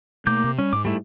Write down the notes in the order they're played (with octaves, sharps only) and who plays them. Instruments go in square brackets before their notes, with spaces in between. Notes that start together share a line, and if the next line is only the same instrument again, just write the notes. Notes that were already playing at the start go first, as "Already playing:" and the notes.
[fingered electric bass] B2 A3 [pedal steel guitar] A#3 D6 G6
[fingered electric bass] C3
[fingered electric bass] G3 [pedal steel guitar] C#4
[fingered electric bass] G#2 [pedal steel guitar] D6
[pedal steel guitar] G3 A3 E4